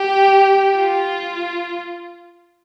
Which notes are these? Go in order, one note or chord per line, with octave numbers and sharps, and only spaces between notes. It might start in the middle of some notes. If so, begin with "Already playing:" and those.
Already playing: G4
F4